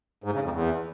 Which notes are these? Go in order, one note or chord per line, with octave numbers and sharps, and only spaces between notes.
G#2
C#3
F2
E2